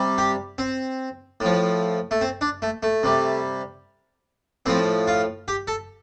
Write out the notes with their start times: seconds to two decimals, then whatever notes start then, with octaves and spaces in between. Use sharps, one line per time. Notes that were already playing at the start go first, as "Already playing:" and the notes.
Already playing: C3 G3
0.18 G4
0.58 C4
1.40 A2 F3
2.11 A3
2.21 C4
2.41 D4
2.62 A3
2.83 A3
3.03 C3 G3
4.66 A2 F3 C4
5.08 F4
5.48 G4
5.67 A4